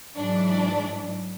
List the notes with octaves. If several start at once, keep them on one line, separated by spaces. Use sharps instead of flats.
G#2 E3 F#3 D4